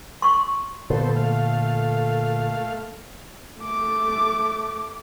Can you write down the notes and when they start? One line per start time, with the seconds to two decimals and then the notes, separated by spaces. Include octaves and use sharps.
0.22 C6 C#6
0.90 A#2 D3 B3 A4 C5
1.16 A3 F5
3.59 A3 D6